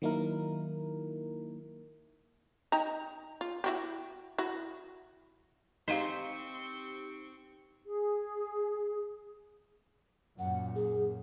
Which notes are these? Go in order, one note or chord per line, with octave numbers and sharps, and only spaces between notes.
D#3 F#3 A#3 D#4 E4 A#4
D#4 G5 A#5
F4
E4 F#4 G4
E4 F#4
C4 D#4 G4 C5 D#5 F5 G#5 C#6
G#4
F#2 A#2 F#5
G#4